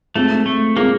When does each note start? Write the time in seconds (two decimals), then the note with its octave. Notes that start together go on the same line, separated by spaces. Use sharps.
0.16 G#3 A3 C4 F4 G#4
0.46 A3
0.76 G#3 A#3 C4 F4 G#4